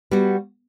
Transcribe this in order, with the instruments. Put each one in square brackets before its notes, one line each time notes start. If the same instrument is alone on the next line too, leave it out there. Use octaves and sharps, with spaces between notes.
[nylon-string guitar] G3 B3 F#4